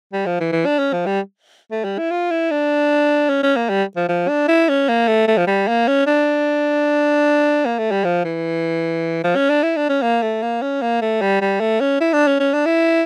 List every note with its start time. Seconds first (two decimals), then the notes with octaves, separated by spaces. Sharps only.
0.13 G3
0.26 F3
0.40 E3
0.52 E3
0.66 D4
0.79 C#4
0.93 F3
1.06 G3
1.71 A3
1.84 G3
1.98 E4
2.11 F4
2.31 E4
2.51 D4
3.29 C#4
3.43 C#4
3.56 A#3
3.70 G3
3.96 F3
4.09 F3
4.28 D4
4.48 E4
4.69 C#4
4.89 A#3
5.08 A3
5.28 A3
5.37 F3
5.47 G3
5.68 A#3
5.88 C#4
6.07 D4
7.66 A#3
7.78 A3
7.91 G3
8.04 F3
8.25 E3
9.24 F3
9.36 C#4
9.50 D4
9.63 E4
9.76 D4
9.89 C#4
10.02 A#3
10.22 A3
10.42 A#3
10.62 C#4
10.82 A#3
11.02 A3
11.21 G3
11.41 G3
11.61 A3
11.81 C#4
12.01 E4
12.13 D4
12.27 C#4
12.40 C#4
12.54 D4
12.66 E4